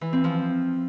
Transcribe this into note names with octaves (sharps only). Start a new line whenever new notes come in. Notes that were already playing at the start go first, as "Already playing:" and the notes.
E3
C4
F3